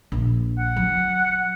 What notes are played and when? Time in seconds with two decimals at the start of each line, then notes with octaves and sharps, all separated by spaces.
0.12 A#1
0.58 F#5
0.76 F#3